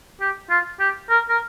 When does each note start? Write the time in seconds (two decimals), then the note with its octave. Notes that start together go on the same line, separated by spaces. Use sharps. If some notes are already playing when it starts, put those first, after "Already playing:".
0.21 G4
0.50 F4
0.80 G4
1.09 A#4
1.29 A#4